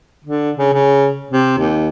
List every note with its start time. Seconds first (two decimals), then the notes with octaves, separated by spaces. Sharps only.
0.24 D3
0.57 C#3
0.73 C#3
1.31 C3
1.58 D#2